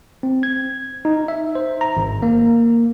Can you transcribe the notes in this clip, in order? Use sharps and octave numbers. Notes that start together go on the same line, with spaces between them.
C4
G#6
D#4
E5
C5
A#5
G#1
A#3